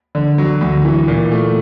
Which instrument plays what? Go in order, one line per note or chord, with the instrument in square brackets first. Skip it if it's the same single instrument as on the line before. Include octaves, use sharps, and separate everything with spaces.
[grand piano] D3
F#3
D2
E3
A#2
A3